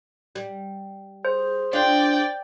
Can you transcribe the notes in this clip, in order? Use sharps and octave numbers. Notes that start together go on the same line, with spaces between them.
G3
G#4 C5
D4 F4 D5 G5